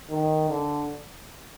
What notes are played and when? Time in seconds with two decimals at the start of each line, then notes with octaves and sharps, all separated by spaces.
0.10 D#3
0.49 D3